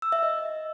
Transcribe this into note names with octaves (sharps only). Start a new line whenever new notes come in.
E6
E5
D#5